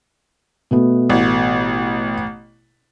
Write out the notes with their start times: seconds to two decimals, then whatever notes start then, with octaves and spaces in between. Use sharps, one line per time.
0.71 B2 A3 B3
1.10 A1